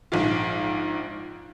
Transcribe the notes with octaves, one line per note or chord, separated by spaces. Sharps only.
A#1 G#2 F4